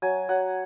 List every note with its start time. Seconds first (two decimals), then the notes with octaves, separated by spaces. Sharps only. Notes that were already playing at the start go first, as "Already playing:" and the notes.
0.02 F#3 G#5
0.29 F#3 F#5